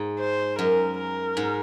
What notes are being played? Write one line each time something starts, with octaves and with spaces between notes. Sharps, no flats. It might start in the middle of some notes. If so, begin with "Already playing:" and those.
Already playing: G#2
C5
F#2 A#4
A#4
G#2